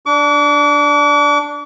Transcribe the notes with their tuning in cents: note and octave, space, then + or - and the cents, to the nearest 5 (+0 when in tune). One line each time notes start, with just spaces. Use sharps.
D4 +0 D6 -40